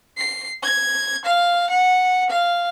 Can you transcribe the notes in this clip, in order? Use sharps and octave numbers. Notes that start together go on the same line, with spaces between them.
C7
G#6
F5
F#5
F5